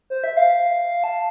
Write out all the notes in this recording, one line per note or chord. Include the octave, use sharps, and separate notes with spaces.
C5
E5
F5
A5